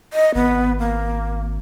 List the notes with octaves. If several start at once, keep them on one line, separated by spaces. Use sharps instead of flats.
D#5
G#1 B3
A#3